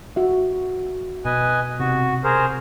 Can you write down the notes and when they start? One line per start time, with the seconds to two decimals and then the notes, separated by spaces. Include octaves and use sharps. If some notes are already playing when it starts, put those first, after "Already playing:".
0.16 F#4 E5
1.25 B2 B4 D#5 G#5
1.80 C3 F#4
2.24 G#4 A#4 C5